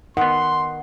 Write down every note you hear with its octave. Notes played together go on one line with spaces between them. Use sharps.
D#3 B3 F#5 C6